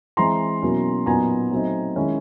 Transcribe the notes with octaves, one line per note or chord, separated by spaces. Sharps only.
E3 G#3 C4 E4 A#5 C6
B2 F#3 A#3 C#4 E4
A#2 F#3 B3 D#4 G#5 A#5
F#3 A3 C4 D#4
D#3 G#3 C#4 E4